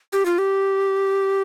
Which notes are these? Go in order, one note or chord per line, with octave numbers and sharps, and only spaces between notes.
G4
F4
G4